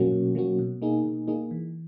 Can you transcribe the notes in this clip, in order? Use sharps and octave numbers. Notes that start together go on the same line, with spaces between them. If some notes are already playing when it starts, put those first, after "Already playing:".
Already playing: B2 F#3 A#3 C#4 F#4
B2
F#3 A#3 C#4 F#4
B2
A#3 D#4 G#4
B2
A#3 D#4 G#4
E3